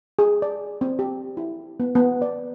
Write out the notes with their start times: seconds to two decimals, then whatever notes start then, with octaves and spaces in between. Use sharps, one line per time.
0.19 G#4
0.42 D5
0.81 C4
0.99 G4
1.37 E4
1.80 B3
1.95 B3
2.22 D5